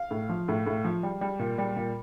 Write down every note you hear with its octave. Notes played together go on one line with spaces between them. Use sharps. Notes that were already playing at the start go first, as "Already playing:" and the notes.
Already playing: F5
A2
F3
A2
A2
F3
G3
G3
A#2
G3
A#2